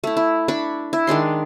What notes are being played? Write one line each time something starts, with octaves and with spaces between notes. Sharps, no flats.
A3 E4
E4
D4 B5 C#6
E4
D#3 G#3 D4 C6